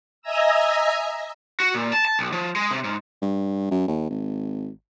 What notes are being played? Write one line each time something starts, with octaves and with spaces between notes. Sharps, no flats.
D#5 E5 G#5 A#5 E6
F#4
A#2
A5
A5
B1
F3
G#3
C3
G#2
G2
F#2
D#2
G#1